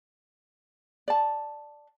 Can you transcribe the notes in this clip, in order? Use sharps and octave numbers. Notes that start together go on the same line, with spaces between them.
D5 A5